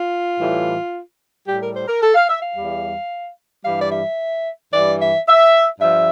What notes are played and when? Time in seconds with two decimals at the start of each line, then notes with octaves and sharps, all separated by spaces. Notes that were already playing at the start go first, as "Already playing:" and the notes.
Already playing: F4
0.39 A2 E3 G3
1.47 A2 G3 G4
1.60 A#4
1.74 C5
1.88 A#4
2.01 A4
2.15 F5
2.28 E5
2.41 F5
2.55 E2 E3 G3
3.64 G2 E3 G3 F5
3.81 D5
3.91 E5
4.72 G2 E3 G3 D5
4.99 E5
5.26 E5
5.80 G2 F3 E5